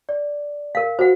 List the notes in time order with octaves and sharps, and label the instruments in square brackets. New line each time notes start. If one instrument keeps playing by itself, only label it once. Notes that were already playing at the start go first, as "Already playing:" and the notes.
[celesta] D5
[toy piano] A#4 F5
[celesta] F#4 [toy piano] C5 F#5